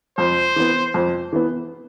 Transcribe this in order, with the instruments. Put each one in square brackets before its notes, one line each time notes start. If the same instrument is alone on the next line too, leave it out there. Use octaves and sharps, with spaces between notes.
[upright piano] F2 [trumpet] C5
[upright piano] E3 B3
F2
E3 B3